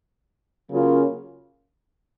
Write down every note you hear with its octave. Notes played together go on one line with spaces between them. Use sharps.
C#3 F#3 A#3 C#4 F4